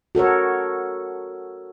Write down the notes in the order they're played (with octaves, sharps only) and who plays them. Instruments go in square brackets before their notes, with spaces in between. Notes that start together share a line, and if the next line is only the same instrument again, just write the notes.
[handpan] F#4 A4 A#4 C#5